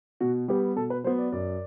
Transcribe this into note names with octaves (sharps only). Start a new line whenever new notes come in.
B2 F#4
G3 B3 G4
B2 A4
B4
F#3 B3 C5
D5
F#2 D5